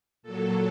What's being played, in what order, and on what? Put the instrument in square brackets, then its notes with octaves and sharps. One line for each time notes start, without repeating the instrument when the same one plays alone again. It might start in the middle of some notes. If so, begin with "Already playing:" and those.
[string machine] A#2 F#3 A4